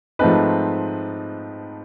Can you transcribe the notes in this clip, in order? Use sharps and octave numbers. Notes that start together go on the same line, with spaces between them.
G#2 F3 A3 C4 D#4 B4